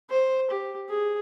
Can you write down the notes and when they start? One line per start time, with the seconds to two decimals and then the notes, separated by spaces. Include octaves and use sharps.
0.10 C5
0.51 G4
0.89 G#4